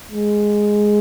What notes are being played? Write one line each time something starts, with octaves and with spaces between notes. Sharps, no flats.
G#3